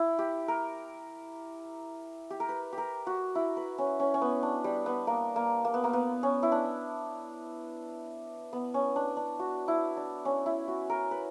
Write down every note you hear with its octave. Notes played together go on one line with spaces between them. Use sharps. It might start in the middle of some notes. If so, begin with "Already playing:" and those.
Already playing: E4
G4
A#4
G4
A#4
B4
G4
A#4
F#4
E4
B4
C#4
C#4
C#4
B3
D4
G3
B3
A#3
A#3
A#3
B3
A#3
B3
C#4
E4
D4
B3
C#4
D4
D4
F#4
E4
D4
C#4
E4
F#4
A#4
B4